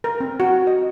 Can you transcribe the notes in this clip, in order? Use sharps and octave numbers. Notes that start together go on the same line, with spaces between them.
A#4
C4
F#4
D#5